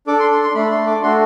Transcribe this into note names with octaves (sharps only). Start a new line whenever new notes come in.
D4 A4 D6
C6
C6
C6
A3 D4 A4 B5
C6
D6
A3 D4 F#4 A4 C6